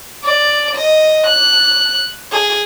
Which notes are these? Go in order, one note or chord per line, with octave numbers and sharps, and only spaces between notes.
D5
D#5
F#6
G#4